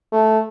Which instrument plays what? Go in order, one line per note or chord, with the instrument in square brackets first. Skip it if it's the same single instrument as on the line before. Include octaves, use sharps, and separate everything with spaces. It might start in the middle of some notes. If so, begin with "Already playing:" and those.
[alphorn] A3